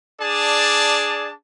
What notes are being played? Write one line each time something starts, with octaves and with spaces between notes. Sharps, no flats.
D4 G#4 D5 A5